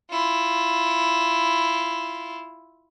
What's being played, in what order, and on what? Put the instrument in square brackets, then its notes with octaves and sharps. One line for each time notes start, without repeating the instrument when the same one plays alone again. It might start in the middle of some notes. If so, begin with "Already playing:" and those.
[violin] E4 F4